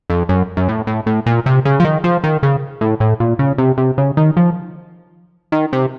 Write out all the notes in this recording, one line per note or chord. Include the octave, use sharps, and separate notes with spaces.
F2
F#2
F#2
A2
A2
A2
A#2
C3
C#3
F3
D#3
F3
D#3
C#3
A2
A2
A#2
C#3
C3
C3
C#3
D#3
F3
D#3
C3